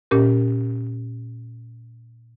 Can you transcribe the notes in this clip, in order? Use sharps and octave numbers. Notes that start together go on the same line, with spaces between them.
A#2 C#4 G4 A#4